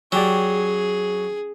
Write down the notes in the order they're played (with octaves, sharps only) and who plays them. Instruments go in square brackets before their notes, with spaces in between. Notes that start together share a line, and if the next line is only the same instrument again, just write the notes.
[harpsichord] F#3 [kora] C#4 G4 D5 [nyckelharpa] G#4